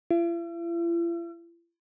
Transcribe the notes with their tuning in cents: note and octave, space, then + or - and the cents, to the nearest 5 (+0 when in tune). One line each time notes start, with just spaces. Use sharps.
E4 +45